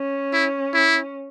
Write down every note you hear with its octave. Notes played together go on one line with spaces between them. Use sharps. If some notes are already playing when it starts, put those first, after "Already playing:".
Already playing: C#4
E4
E4